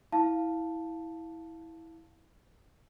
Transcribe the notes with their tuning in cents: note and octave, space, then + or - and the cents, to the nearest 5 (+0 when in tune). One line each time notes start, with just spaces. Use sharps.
E4 -15 F5 +5 A5 +0